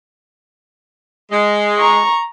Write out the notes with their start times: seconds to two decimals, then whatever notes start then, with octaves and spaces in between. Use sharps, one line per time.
1.32 G#3
1.79 A#5 C#6